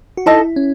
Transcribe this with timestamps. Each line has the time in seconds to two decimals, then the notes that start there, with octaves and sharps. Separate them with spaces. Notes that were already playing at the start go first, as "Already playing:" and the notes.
0.17 F#4
0.26 D#4 E4 A4 D#5 A5
0.56 C#4